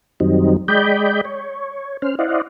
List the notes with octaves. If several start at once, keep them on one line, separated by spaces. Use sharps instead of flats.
F#2 D#3 F#3 G3 C4 D#4
G#3 D5 D#5 G5 B5 G6
C#5
C#4 C5 F6
E4 C5 D5 D#5 F5 F#5